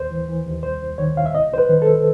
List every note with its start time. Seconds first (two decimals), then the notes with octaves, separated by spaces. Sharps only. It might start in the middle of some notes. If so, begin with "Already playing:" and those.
Already playing: D#2 C5
0.11 E3
0.28 E3
0.46 D#2
0.63 C2 C5
0.81 C2
0.98 D#3 C#5
1.16 C2 F5
1.26 E5
1.34 C2 D#5
1.52 C2 C5
1.58 B4
1.69 D#3
1.82 A4
1.87 C2